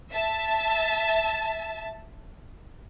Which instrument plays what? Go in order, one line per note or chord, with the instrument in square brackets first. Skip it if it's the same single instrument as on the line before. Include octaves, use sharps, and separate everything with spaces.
[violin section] E5 A5